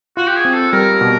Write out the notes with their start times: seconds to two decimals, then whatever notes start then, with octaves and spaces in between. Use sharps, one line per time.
0.17 F4 F#4
0.27 G4
0.35 G#4
0.45 C4
0.54 A4
0.72 G3 A#4
1.01 B2